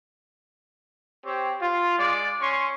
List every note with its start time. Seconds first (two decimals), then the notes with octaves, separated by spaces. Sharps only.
1.25 C4 G4 C#5
1.60 F4
1.97 G#3 D5
2.40 C#4 C6 C#6